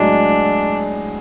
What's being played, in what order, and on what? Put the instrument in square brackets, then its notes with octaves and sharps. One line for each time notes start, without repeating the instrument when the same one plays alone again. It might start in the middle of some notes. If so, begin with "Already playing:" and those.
Already playing: [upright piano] A2 F#3 G#3 [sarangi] D4